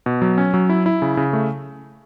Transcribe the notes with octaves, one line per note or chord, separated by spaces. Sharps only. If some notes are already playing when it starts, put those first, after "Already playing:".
B2
F#3
C#4
F#3
E4
E4
C#3
C#3
A3